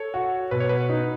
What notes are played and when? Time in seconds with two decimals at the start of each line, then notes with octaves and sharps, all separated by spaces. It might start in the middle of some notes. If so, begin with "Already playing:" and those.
Already playing: A4 C#5
0.14 F#4
0.51 B2 B4
0.60 C#5
0.69 B4
0.90 D#4